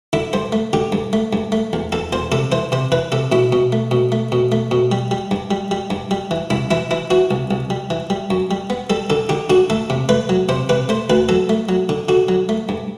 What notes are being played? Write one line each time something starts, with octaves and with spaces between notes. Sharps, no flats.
D3 E4
G2 C5
A3
D3 G4
G2
A3
G2
A3
E2
E2 A4
E2 C5
C3 A4
E3 C5
C3 C5
E3 B4
C3 A4
B2 E4
B2
A3
B2
A3
B2
A3
B2
G3
G3
G2
G3
G3
G2
G3
E3
C2 E4
E3 E4
E3 E4
E3 F#4
C2
C2
G3
E3
G3
F#2
G3
B3
G3 A4
D3 A4
D3 G4
D3 F#4
A3 A4
C3
A3 B4
F#3
C3 C5
C3 B4
A3 C5
D2 B4
F#3 A4
A3
F#3
D3
D3 F#4
F#3
A3
G2